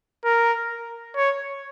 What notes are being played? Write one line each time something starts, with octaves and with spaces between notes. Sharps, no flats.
A#4
C#5